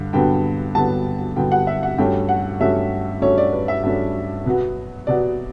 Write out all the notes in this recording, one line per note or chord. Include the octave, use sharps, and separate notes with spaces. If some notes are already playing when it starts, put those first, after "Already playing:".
Already playing: G2 D3
G2 D3 F#3 B3 G5
G2 D3 F#3 B3 A5
G2 D3 F#3 B3 G5
F#5
E5
F#5
G2 F#3 A3 C#4 G5
F#5
G2 F#3 A3 C#4 E5
G2 F#3 A3 C#4 C#5
D5
B4
E5
G2 F#3 A3 C#4
B2 F#3 B3
B2 F#3 B3 D5